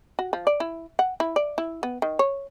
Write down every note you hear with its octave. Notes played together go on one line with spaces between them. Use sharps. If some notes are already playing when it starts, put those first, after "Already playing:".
F#4
F3
D5
E4
F#5
E4
D5
E4
B3
D#3
C#5